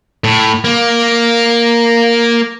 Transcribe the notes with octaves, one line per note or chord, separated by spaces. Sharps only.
A2
A#3